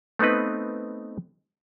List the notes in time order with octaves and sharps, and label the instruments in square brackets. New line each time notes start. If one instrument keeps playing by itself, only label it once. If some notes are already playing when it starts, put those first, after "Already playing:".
[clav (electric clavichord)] A3 B3 C4 D#4 B4